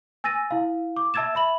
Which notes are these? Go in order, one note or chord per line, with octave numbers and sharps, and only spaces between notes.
G#5 E6 A6 A#6 D#7
E4 F5
D6
E5 A5 E6 G#6 A6 E7
E5 B5 F#7